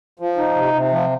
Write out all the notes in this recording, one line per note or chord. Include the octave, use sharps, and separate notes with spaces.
F3
D#4
C3
C3
F3